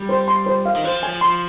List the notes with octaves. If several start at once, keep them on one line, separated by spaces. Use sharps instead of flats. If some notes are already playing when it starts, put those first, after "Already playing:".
Already playing: G3
C5
C6
C5
F5
D#3
F3 C5
G#5
C6